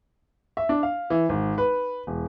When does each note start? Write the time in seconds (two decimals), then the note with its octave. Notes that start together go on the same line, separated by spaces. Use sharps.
0.57 E5
0.69 D4
0.83 F5
1.10 E3
1.29 G#1
1.58 B4
2.07 E1